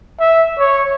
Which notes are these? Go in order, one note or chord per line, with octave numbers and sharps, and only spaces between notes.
E5
C#5